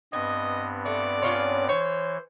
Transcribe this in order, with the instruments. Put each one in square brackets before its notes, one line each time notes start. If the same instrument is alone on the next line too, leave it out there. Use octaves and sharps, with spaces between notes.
[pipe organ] G2 B3 C4 [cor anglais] D#5 [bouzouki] G#5
[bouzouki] A3 [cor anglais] D5
[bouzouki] C#4 F4 C#5
[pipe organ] E3 [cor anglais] C5 [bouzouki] C#5